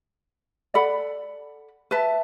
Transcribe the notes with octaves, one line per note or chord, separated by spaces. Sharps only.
A4 D5 F#5 B5
B4 E5 A5